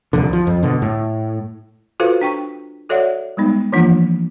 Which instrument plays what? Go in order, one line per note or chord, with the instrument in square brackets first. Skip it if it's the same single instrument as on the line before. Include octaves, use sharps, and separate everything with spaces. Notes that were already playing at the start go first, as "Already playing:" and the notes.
[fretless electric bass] D#1 C2 F2 D3
F3
F2
B2 D3
A2
[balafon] F4 F#4 A4 B4 C5 F5
D4 G5 C#6
F#4 A4 C#5 D5 E5 F#5
G3 G#3 B3 D#4
E3 F3 A#3 D4 F4 F#5